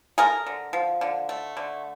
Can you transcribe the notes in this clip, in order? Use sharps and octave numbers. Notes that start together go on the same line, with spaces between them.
A3 G#4 A#4
D3
F3
D3
A3
D3